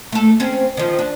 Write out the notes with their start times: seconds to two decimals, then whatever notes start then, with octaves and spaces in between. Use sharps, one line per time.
0.12 A3 A4
0.40 C4 C#4
0.77 D#3 F3
0.99 D4